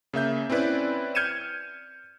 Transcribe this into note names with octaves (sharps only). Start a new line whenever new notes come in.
C#3 A#3 E5 G6
C4 C#4 E4 B4 D5
F6 G6 G#6 C#7 D#7 E7